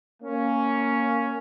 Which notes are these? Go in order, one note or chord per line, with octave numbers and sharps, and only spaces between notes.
A#3 C#4